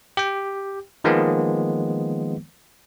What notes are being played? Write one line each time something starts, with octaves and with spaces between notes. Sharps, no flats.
G4 G5
D#3 F3 G#3 A#3 B3